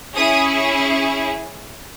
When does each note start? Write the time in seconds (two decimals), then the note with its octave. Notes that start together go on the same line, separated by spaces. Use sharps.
0.15 C#4 E4 G#4 D#6